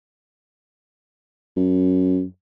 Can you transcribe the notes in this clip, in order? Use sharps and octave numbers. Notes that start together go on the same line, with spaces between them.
F#2